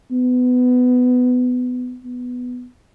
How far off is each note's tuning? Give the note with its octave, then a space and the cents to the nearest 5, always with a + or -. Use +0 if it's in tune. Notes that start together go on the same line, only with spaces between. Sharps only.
B3 +20
B3 +5